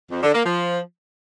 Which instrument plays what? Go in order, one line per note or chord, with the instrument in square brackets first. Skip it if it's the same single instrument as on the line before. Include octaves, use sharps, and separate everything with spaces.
[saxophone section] F2
D3
A#3
F3